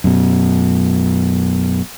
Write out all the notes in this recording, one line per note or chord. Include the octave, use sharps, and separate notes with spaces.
F#2 B2